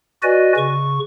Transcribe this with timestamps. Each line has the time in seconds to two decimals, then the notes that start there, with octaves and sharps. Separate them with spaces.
0.23 F#4 B4 D5 D#5 G#5
0.57 C#3 C#6